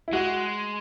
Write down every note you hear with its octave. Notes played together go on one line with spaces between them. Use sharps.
E4
G#3 F#4